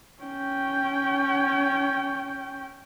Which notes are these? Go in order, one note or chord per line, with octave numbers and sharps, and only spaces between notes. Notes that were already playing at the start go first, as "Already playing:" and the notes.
C#4 G5